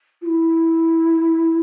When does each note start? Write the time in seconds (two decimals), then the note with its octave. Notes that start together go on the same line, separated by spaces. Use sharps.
0.21 F4
0.26 E4